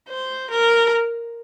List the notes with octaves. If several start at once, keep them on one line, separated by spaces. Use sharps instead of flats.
C5
A#4